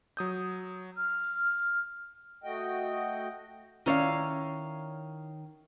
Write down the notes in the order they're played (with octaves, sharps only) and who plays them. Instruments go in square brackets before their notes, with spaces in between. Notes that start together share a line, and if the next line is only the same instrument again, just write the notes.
[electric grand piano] F#3 D#6 G6
[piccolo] F6
[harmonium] A3 F#4 D#5 G5
[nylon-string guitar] D#3 C#5 F5 [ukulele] C#4 E4 D5